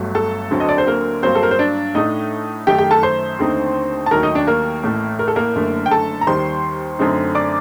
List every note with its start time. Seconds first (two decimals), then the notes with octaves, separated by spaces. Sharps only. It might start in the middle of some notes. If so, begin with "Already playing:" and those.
Already playing: G1 G2 F#3 A3
0.15 A4 A5
0.51 D2 D3 F#3 C4
0.60 D#5
0.69 D5
0.78 C5
0.87 A#3 A#4
1.23 G2 F#3 A#3 C4 C5
1.35 A4
1.43 A#4
1.51 C5
1.59 D4 D5
1.95 A2 A3 D4 D#4 D#5
2.67 F#2 D#3 A3 D#4 G4 G5
2.78 G4 G5
2.91 A4 A5
3.03 C5 C6
3.39 D#2 D3 A3 C4 D#4
4.06 A5
4.11 D#2 D#3 F#3 A3 A#4 A#5
4.23 D#4 D#5
4.35 D4 D5
4.47 A#3 A#4
4.83 A1 A2 A3
5.19 A#4
5.28 A4
5.36 A#3 A#4
5.55 F#1 F#2 D3 A3
5.86 G5
5.91 A4 A5
6.21 A#5
6.27 D#2 D#3 G3 C5 C6
6.99 F#2 D3 A3 C4 D#4
7.35 D5 D6